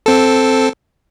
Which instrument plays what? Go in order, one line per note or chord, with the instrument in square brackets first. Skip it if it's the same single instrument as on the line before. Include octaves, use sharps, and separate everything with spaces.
[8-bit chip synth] C4 A4